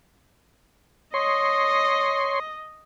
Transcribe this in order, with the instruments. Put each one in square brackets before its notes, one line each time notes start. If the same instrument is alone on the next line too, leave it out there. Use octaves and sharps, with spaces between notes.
[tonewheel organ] C#5 C6 [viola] D#5